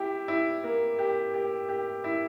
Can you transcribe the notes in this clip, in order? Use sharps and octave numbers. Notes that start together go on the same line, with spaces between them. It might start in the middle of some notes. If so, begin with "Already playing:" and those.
Already playing: E4 G4
E4
A#3
G4
G4
G4
E4